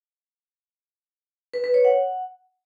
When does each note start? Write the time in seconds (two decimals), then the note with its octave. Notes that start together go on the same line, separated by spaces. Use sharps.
1.54 B4
1.64 B4
1.74 C#5
1.85 F#5